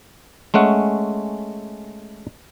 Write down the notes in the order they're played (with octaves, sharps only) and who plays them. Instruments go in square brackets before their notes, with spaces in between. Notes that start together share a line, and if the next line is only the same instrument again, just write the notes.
[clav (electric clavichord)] G#3 A3 C#4 F#5